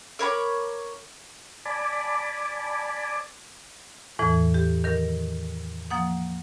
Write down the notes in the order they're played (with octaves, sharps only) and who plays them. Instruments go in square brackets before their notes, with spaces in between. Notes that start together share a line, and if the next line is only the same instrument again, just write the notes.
[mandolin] A#4 C#5 B5 D6
[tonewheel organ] D5 G#5 A5 B5 D6
[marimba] E2 A2 E3
G4
D#3 A#4
F3 A#3 F#5 D#6